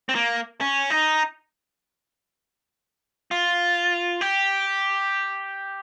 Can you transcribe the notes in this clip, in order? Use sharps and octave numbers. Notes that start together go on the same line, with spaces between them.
C4
A#3
C#4
D#4
F4
G4